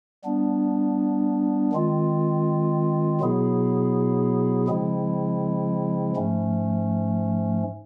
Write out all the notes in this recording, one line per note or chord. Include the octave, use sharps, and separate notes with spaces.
G3 B3 D4
D#3 G#3 C4 F4
B2 F#3 B3 E4 G#4
C#3 F3 G#3 C4 E4
G#2 F3 A3 C#4